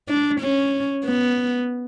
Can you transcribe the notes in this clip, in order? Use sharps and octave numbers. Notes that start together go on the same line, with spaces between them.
D4
C#4
B3